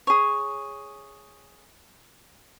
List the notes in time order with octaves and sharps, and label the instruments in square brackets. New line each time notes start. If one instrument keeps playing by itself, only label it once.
[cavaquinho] G#4 C#5